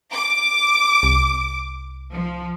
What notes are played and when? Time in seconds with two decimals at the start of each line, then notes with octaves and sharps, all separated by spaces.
0.12 D6
1.03 C2
2.12 F3